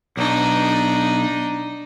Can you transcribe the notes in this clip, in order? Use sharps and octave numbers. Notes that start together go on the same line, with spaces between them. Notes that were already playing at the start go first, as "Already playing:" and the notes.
B1 D4 D#4